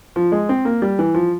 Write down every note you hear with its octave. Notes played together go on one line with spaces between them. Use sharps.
F3
G#3
C4
A#3
G3
E3
F3